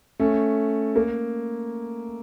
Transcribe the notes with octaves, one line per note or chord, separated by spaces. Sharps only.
A3 C#4
A#3